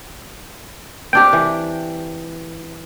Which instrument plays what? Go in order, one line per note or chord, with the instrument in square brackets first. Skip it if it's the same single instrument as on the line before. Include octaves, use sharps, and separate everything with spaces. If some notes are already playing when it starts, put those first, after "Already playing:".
[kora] C4 D4 G4 [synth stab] G5
[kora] E3